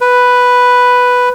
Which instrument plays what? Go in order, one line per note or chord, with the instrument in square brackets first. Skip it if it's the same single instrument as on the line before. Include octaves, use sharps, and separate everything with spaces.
[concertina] B4